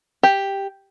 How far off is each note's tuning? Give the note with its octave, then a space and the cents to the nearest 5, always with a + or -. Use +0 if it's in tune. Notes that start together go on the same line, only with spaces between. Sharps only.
G4 +5